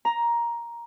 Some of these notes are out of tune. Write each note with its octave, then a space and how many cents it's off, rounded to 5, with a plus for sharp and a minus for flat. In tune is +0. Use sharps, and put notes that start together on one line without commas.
A#5 +10